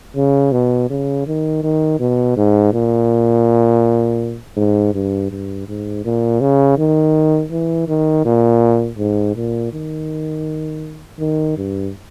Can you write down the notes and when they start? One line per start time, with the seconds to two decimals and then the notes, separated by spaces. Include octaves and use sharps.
0.16 C#3
0.52 B2
0.90 C#3
1.27 D#3
1.63 D#3
2.00 B2
2.37 G#2
2.73 A#2
4.57 G#2
4.94 G2
5.31 G2
5.68 G#2
6.05 A#2
6.41 C#3
6.78 D#3
7.51 E3
7.88 D#3
8.25 A#2
8.98 G#2
9.36 A#2
9.73 D#3
11.20 D#3
11.57 G2